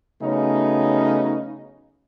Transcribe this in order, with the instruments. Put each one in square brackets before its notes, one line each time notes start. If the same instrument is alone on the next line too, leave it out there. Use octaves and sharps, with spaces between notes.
[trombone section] C#3 F#3 A3 B3 C#4 D#4